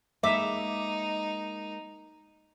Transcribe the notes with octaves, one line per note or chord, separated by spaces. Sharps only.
G#3 A#3 D#4 E5 D6